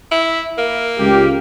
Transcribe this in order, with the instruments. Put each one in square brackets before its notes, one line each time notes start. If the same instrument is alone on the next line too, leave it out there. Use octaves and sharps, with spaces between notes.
[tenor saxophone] E4
A#3
[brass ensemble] C#2 G4